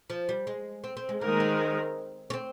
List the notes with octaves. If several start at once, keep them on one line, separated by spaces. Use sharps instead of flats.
F3
G3
G#3
C4
C4
G#3
D#3 G#3 A#3 D#4 A#4
C4
C#4
C4